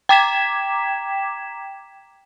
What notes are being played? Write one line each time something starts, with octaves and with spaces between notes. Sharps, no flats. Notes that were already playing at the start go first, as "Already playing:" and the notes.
G5 A#5 D6 G#6 B6 E7